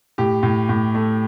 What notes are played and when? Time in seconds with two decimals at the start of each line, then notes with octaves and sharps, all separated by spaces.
0.18 A2 G4
0.43 A2
0.69 A2
0.95 A3